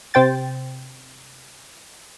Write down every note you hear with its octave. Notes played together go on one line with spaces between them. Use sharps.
C3 C5 G5 A6